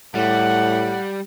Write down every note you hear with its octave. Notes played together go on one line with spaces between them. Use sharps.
A2 G3 F#5